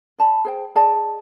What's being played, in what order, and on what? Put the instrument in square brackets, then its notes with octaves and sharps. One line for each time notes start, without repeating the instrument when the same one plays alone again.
[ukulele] D5 A5 B5
G#4 C5 G5
G#4 D5 D#5 A5